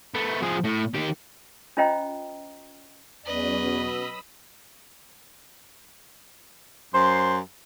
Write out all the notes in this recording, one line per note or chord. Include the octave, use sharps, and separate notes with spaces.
A3 B3
F3 G#4
A2
D#3 G4
C#4 F4 C5 D#5 G5 A#5
E2 F#3 C#4 B4 D5 D#5
B2 B5 D#6 E6
F#2 C5 C6